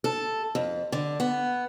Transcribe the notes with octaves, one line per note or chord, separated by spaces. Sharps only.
A4
F2
D3
B3